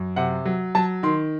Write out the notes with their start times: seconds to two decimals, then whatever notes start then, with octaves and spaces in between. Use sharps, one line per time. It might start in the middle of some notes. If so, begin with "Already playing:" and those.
Already playing: F#2
0.16 C3 F#5
0.45 F#3
0.75 F#3 A5
1.03 D#3 C6